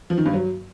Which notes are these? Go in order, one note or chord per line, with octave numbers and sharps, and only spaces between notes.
F3
D#3
G2
F#3